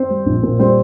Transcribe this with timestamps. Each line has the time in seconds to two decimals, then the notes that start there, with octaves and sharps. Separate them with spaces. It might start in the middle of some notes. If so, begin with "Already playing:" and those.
Already playing: C4 C5
0.10 G3
0.26 A#1
0.43 A#2
0.59 G3 C4 C5